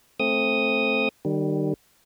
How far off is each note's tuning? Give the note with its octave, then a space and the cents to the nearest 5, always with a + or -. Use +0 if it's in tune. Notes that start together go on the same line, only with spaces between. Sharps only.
A3 +0 C4 +15 D#6 +0
D#3 -35 G3 -15